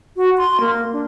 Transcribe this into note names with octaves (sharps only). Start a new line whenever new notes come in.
F#4
C6
A#3
D4